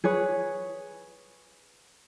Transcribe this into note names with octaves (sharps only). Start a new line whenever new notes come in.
G#4 B4 C#5